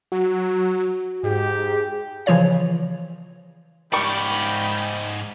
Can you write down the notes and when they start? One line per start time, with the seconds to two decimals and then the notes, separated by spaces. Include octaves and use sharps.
0.12 F#3 F#4
1.23 G#2 G4 G#4
2.26 C#3 E3 F3 F4 C#5 F5
3.93 G#2 D#3 G3 D5 G5 B5 C#6